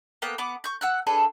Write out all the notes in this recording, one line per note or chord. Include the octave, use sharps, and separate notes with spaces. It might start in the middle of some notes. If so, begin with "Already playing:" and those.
A#3 B3 G5 F#6
B3 F#5 D6
C#6 G6
F#5 E6 F#6
D4 G#4 A4 B4